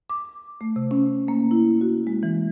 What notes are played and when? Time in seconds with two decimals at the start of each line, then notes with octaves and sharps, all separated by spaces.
0.10 D6
0.61 A3
0.76 C3
0.91 C#4
1.28 A#3
1.51 E4
1.81 F#4
2.07 G#3
2.23 E3